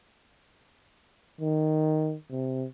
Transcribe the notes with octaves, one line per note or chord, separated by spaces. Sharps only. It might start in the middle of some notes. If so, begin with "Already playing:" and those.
D#3
C3